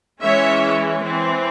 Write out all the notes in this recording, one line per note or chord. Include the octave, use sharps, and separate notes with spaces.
E3 G#3 C#4 C#5 E5
E3 C4